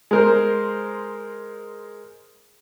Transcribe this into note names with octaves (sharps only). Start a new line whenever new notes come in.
G#3 A#4 C5